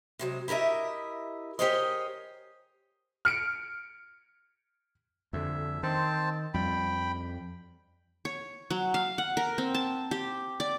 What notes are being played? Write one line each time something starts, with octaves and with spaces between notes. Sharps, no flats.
C3 F#3 G#3
E4 G4 A#4 D#5 E5
G4 G#4 A#4 C5 C#5 D#5
F6 C#7 D7
F2 D3 E5
D#3 C4 C5 A5
F2 G3 G5 B5
C#5
F#3
F5
F#5
A#4
C4
A5
G4
D5